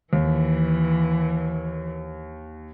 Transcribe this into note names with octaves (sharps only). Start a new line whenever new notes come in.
D#2 E3